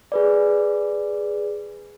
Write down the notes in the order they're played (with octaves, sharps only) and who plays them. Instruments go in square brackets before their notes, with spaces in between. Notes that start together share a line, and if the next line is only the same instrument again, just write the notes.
[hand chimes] G#4 B4 D5